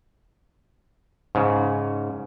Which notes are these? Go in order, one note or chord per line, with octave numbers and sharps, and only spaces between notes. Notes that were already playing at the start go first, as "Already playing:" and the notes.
G#2 C#3